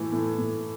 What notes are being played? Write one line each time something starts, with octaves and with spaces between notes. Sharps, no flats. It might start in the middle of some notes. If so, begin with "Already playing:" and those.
Already playing: A2 E3 A3
A2
A2